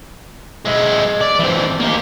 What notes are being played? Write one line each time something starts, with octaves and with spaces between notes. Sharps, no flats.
G#3 E4
D5
E3 C4
A#3 G4